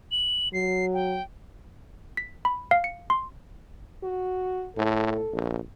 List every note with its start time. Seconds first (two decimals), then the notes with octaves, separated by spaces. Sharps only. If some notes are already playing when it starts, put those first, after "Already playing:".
0.11 F#7
0.53 F#3 C7
0.94 G5
2.17 B6
2.45 B5
2.71 F5
2.84 C#7
3.10 C6
4.03 F#4
4.77 A2 A4
5.33 A#1